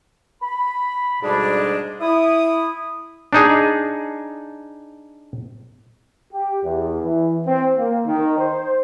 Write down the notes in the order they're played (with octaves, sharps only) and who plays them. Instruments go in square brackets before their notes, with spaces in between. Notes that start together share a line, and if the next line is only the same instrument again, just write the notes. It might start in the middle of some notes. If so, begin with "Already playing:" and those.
[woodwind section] B5
D2 G#2 B2 G3 G#3 D4
E4 D#6
[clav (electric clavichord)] D4 D#4 G#4
[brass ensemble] G4
E2
E3
C4
A#3
D#3
C5